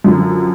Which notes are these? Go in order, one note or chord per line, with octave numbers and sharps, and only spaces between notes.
F#2 D3 F3